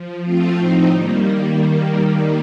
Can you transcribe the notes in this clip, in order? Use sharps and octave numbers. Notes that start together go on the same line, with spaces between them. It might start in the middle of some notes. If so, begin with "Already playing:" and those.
Already playing: F3
F3 A3 C4 F4
A2 F3 C4 D#4
D#3 G3 A#3